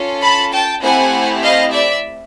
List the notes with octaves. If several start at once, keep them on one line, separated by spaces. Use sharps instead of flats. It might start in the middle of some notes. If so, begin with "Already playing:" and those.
Already playing: C#4 F4 A4
A5 B5
G5 A5
A3 C4 E4 G4 F#5 G#5
D#5 F5
D5 E5